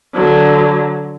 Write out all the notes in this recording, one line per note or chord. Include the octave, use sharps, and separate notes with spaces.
D3 F#3